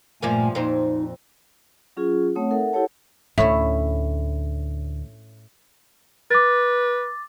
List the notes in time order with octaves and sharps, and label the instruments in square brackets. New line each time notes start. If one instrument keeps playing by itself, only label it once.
[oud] G2 F3 A#3 [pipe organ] A#2 A3 G#5
[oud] F2 A#2 C5 [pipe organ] D#4
[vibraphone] F#3 C#4 F4 G#4
A3 C4 C#5 F#5 D#6
D#4 A4 A#4 E5 F#5
E4 G4 A4 C#5 F#5 A5
[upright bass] D2 [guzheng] A2 C#4 E4 [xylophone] E5
[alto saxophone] B4 [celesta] D6 A6